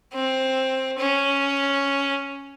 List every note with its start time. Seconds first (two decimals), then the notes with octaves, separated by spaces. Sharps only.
0.14 C4
0.99 C#4